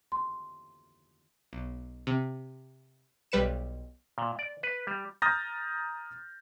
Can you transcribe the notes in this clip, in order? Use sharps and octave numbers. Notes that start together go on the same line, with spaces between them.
C6
B1
C3
B1 G3 B4 C#7 E7
A#2
D5
B4
G3
A#5 D#6 F6 G6 A6 A#6